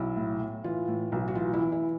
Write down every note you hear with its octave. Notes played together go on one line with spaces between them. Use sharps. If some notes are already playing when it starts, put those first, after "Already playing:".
Already playing: B1 E4
A2
A2
E3 F4
A2
B1
F#4
E3 F4
E4
E3
E4